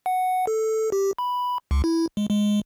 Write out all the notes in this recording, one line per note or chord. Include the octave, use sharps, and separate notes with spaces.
F#5
A4
G4
B5
C#2
E4
G#3
G#3